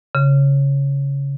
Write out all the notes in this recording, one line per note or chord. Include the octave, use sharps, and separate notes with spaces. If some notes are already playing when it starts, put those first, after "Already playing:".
C#3